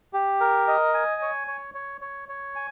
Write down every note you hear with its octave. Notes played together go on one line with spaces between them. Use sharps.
G4
A#4
D#5
G#5
C#5
C#5
C#5
C#5
C#5
G#5